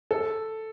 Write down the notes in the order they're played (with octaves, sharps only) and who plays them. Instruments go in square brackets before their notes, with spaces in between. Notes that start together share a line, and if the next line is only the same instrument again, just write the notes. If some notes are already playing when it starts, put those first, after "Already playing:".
[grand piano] A4